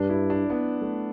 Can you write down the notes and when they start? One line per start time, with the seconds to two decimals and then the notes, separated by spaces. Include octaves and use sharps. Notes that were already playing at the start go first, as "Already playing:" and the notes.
Already playing: G2 D4
0.09 E4
0.30 D4
0.50 B3
0.81 A3